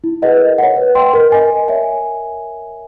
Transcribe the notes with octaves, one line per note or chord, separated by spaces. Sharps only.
E4
G#4 B4 D#5 F#5
A#4
C#5 F#5
B4
D#5 G5 C6
A#4
D#5 G#5
A#4
C#5 E5 G#5